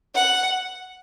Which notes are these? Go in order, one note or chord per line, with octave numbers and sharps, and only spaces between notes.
F#5